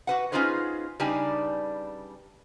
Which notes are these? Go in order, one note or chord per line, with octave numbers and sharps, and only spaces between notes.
F#4 B4 F#5
C#4 D#4 F4 G#4 B4 C5
C#3 G3 D4 D#4 B4 G#5